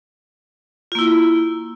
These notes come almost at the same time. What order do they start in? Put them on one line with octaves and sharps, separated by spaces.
F4 A#3 E4